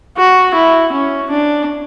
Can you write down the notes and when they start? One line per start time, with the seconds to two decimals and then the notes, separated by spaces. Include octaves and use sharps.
0.17 F#4
0.55 E4
0.92 C#4
1.30 D4